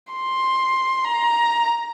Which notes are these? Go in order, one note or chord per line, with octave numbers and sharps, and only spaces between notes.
C6
A#5